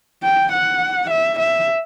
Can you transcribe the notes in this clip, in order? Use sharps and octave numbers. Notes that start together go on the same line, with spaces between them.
G5
F#5
E5
E5